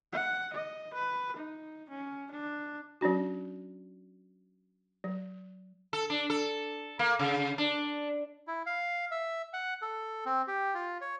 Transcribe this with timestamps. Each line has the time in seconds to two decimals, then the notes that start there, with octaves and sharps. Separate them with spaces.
0.13 F#5
0.53 D#5
0.94 B4
1.36 D#4
1.90 C#4
2.32 D4
3.01 F#3 C#4 D4 F#4
5.04 F#3
5.93 A4
6.10 D4
6.30 A4
6.99 A#3
7.19 C#3
7.58 D4
8.47 E4
8.66 F5
9.11 E5
9.54 F#5
9.82 A4
10.26 C4
10.48 G4
10.74 F4
11.01 C#5